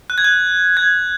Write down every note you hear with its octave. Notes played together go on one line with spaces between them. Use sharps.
F#6
G#6
F#6
G#6